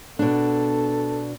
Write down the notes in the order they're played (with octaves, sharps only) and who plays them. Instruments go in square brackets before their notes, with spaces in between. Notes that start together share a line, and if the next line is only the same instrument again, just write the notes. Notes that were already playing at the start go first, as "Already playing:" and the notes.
[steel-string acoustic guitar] B2 D4 [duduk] A4